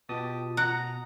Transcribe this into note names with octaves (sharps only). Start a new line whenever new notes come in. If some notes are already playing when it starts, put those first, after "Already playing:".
B2 F4 G4 A5 D#6
F#5 A#5